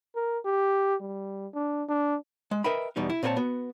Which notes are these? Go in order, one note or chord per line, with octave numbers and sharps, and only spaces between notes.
A#4
G4
G3
D4
D4
G#3
A#4 B4 D#5 E5 G5 B5
E2 B2 G3 D#4
E4
A#2 C4 F4 A#4 C#5 A5
B3 F#4